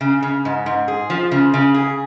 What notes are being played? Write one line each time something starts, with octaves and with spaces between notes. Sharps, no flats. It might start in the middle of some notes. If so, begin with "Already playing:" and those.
C#3
C#3
G#2
G#2
G#4
F3
C#3
C#3
G#4